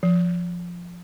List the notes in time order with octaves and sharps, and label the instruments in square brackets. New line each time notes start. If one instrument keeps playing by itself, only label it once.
[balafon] F3